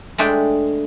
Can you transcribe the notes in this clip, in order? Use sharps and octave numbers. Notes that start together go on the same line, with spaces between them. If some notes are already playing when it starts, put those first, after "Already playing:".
G#3 A3 D4 G5 C6